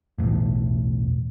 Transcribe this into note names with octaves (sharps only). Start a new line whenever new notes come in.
B1 E2 A2